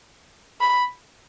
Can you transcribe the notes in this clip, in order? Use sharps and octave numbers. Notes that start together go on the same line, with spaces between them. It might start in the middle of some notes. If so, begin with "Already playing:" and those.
B5